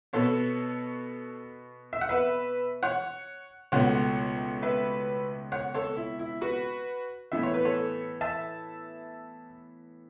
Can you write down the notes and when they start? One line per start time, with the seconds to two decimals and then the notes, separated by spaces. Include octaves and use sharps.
0.13 B2 B3 A4 C#5
1.93 E5
2.01 F#5
2.09 B4 E5
2.83 C#5 F#5
3.72 C#2 B2 A3 C#5 F#5
4.62 B4 E5
5.52 C#5 F#5
5.74 A4 C#5
5.97 E4
6.19 E4
6.41 F#4 B4
7.32 A2 E3 B3 E5
7.43 C#5
7.54 B4
7.65 A4 C#5
8.21 E5 A5